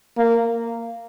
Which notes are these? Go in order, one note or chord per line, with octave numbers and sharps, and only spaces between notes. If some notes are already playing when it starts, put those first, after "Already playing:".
A#3